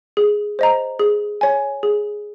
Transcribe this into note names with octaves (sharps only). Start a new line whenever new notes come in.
G#4
C5 D#5 A#5
G#4
C#5 G#5
G#4